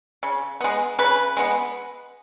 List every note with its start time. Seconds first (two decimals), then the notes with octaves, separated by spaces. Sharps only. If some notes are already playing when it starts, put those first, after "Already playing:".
0.23 C#3
0.61 G#3 B3
0.99 C#3 B4
1.37 G#3 B3